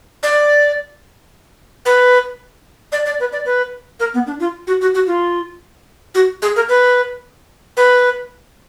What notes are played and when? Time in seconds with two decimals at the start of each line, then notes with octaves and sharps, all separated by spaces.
0.23 D5
1.86 B4
2.92 D5
3.06 D5
3.20 B4
3.32 D5
3.46 B4
4.00 A#4
4.14 B3
4.27 D4
4.40 F4
4.67 F#4
4.81 F#4
4.95 F#4
5.07 F4
6.15 F#4
6.42 G#4
6.56 A#4
6.69 B4
7.77 B4